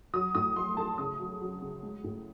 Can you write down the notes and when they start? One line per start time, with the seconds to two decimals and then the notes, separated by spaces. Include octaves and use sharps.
0.14 F#3 D#6
0.35 A2 D#6
0.56 F#3 C6
0.77 A3 A5
0.98 C#3 D#6
1.19 F#3
1.41 F#3
1.62 C#3
1.83 G#3
2.04 A2